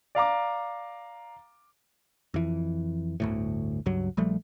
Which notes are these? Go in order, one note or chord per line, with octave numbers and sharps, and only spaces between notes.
D5 F5 A#5 D6
F2 E3
G1 D2 A2
C#2 G2 F#3
A#1 F3 G3 A3